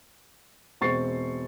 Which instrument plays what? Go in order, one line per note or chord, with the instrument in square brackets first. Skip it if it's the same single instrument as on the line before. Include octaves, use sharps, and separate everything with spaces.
[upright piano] E1 C4 C#6 A6 C7